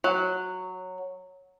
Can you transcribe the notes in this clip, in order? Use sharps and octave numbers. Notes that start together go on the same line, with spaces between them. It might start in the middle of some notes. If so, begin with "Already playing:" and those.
F#3